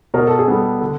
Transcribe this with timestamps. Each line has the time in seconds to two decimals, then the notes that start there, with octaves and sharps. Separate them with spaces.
0.14 B2 A#4
0.27 A4
0.39 G#4
0.48 G3 B3 A4
0.81 D3